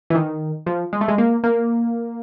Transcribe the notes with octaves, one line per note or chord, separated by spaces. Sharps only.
E3
D#3
F3
G#3
A3
G#3
A#3
A#3